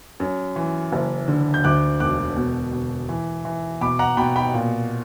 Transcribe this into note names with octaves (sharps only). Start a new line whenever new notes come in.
F#2
E3
F#1
D3
G6
D2 D6 F#6
E1 D6 F#6
B2
B2
E3
E3
B2 B5 D6
F#5 A#5
B2 G5 B5
G5 B5
A#2